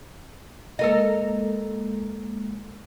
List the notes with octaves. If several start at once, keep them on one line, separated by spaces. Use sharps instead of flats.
G#3 A#3 A4 A#4 D#5